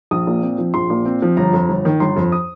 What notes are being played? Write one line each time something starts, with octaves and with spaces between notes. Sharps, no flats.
A#1 D#6
A#2
C4
F3
A#1 C6
A#2
C4
F3
G1 A#5
F2
G1
D#3
G1 C6
F2
D#6